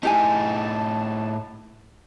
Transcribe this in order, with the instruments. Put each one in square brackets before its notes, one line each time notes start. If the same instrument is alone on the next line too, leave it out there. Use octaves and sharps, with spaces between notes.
[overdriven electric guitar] A2 D#4 [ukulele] E4 G4 G#5 [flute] A5